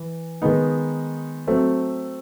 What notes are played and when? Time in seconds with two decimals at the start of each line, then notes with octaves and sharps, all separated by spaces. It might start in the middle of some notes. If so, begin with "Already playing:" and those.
Already playing: E3
0.42 D#3 G#3 B3 D#4
1.47 F#3 A3 C4